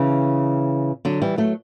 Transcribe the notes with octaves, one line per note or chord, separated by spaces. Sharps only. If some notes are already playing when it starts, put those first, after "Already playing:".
Already playing: C#3 E3
D3 F#3
E3 G3
F#3 A3